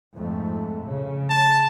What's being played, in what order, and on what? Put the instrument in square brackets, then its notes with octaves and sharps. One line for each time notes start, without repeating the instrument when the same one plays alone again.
[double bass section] F2 G#2 A3
C#3
[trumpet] A5